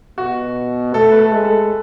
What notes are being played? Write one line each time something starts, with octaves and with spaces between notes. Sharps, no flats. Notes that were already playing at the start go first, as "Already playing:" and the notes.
B2 F#4
A3 A4
B4
A4
G#3
A4